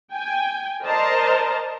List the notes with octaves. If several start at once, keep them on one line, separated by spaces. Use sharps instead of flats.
G5 G#5
A#4 C5 D5 D#5 A5 A#5